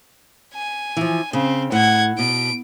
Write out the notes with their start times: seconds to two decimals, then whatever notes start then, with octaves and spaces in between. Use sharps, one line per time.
0.54 G#5
0.97 E3 F3
1.33 C#3 C4
1.72 A2 F#5 G#6
2.19 B2 D7